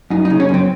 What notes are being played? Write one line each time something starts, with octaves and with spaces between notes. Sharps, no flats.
F#2 D#4
D#4
C#3
C#4
F#2
C4